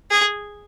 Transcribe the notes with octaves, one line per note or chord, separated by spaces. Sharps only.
G#4